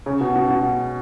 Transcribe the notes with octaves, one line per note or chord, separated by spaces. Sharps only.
C#3
B2
B2
B2